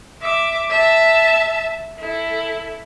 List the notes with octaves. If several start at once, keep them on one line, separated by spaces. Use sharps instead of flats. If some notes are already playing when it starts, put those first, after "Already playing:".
E5 D6
E5 A5
E4 A4